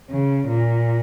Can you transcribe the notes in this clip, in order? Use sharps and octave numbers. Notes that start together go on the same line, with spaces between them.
C#3
A#2